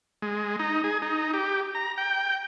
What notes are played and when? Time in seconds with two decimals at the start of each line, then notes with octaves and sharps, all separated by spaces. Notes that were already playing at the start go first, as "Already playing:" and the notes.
0.22 G#3
0.60 D#4
0.84 G#4
1.02 D#4
1.34 G4
1.75 A#5
1.98 G5